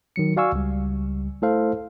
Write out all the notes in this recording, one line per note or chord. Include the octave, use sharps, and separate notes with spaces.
D#3 F#3 C#7
F#4 D5 F5 G#5 C#6 E6
C#2 G3
A3 E4 A4 C5 F5